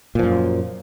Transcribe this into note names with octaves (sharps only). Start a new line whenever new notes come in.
F#2 A#2 F3